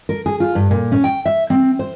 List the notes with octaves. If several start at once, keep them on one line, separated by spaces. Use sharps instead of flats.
A#4
G#4
F4
G2
A#2
C#4
G5
E5
C4
C5